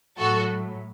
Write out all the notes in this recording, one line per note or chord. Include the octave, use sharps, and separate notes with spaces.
A2 F#3 F#4 A4